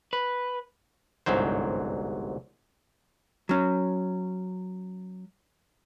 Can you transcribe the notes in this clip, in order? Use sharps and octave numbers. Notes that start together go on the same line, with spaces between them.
B4
G1 C2 G#2 F#3 C5
F#3 C#4